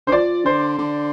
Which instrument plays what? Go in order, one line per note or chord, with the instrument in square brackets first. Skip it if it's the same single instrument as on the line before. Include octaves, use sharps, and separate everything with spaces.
[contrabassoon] D3 [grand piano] C5
[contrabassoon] F3 [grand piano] D5
[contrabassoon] D3 [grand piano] C5
[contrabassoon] D3